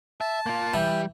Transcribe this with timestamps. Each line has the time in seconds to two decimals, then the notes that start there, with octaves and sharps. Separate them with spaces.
0.21 E5 A5
0.46 A#3 F4
0.74 E3 G3